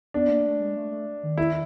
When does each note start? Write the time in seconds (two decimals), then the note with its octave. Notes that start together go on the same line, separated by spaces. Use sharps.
0.14 B3 D4
0.29 A#3
0.46 A3
0.60 G#3
0.76 A3
0.91 A3
1.23 D#3
1.37 E4